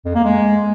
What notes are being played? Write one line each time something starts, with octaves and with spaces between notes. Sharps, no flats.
F2
A#3
G#3